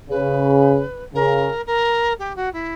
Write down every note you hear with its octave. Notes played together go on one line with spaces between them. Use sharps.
C#3 B4
C#3 A#4
A#4
G4
F#4
E4